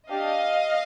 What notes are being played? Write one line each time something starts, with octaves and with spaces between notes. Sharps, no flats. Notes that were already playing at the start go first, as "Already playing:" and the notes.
D4 G4 D#5 F5